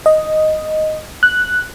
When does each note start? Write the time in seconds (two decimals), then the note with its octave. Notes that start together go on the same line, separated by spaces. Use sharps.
0.06 D#5
1.23 F#6